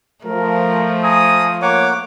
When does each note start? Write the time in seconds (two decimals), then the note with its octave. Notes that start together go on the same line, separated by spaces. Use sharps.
0.25 F3 A3 A#4
1.04 G#5 A#5 D#6
1.62 A#3 C#5 F#5 D6